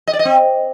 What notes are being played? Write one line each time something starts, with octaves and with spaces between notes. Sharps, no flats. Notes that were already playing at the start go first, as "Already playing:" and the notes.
D#5
D5
D#5
C4